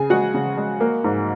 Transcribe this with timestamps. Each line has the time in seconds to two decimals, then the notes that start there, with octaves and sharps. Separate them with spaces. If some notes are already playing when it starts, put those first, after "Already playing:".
Already playing: C#3 G#4 G#5
0.10 G#3 F#4 F#5
0.34 C#3
0.57 G#3
0.80 A#3
1.04 G#2